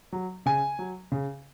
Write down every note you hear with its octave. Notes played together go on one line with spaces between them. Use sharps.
F#3
C#3 G#5
F#3
C#3